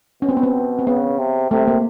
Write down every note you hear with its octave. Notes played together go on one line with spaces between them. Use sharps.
B2 C#4
C4
B3
C4
C4
C#3 B3
C3
C3 A3
A#3